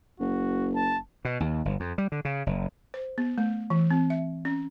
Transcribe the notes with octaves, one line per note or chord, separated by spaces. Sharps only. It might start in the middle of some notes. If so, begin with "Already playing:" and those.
F#1 F#4
A5
B2
D#2
G1
F2
G3
D3
C#3
F#1
C5
B3
A3
E3
C4
E5
C#4